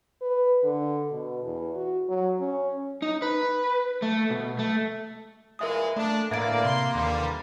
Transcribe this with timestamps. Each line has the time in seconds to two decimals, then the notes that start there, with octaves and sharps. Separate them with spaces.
0.22 B4
0.63 D3
1.12 B2
1.44 E2
1.75 F#4
2.09 F#3
2.40 C#4
3.02 D#4
3.22 B4
4.02 A3
4.31 B2
4.59 A3
5.59 A#2 E3 G#3 A#4 E5 D#6
5.96 A3 D4
6.31 A2 D3 E3 A#3 D5 E5 G#6 D7
6.64 C3 C6
6.95 D#2 D3 E3 G3